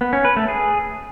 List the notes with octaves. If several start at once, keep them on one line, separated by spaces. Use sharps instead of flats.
B3
C#4
B4
A3
G#4